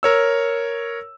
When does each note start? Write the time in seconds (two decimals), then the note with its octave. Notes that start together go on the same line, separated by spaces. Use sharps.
0.03 A#4 C#5 E6